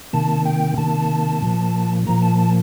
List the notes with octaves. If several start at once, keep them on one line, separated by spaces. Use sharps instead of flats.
C3 D#3 A#3 A5
G5
C3 D#3 A#3 A5
A#2 F3 A#3
A#2 F3 A#3 A#5
A5
A5